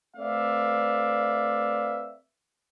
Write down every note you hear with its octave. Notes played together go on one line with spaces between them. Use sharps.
A3 C4 B4 D5 E5 F5